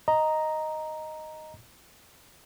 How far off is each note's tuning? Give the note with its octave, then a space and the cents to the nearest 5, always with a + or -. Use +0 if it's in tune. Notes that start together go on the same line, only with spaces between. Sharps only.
D#5 +0 A#5 +0